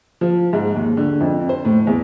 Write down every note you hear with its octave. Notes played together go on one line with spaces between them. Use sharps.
F3
G#2
D#2
D3
F2
C5
A2
E2